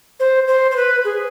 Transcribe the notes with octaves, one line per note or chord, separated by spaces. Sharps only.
C5
C5
C5
B4
G#4